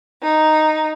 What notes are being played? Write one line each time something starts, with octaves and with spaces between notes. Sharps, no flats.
D#4